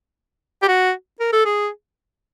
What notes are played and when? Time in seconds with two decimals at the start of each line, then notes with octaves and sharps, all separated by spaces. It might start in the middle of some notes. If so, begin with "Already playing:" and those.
0.62 G4
0.68 F#4
1.20 A#4
1.33 A4
1.45 G#4